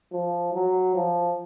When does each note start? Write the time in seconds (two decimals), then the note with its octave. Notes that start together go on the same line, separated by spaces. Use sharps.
0.12 F3
0.54 F#3
0.96 F3